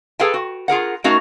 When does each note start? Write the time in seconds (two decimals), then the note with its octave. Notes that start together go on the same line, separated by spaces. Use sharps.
0.20 G#4 A4 B4 F5 G5 G#5
0.34 F#4
0.68 F4 G#4 A#4 F#5
1.04 A3 C#4 D#4 F#4 A#4 F5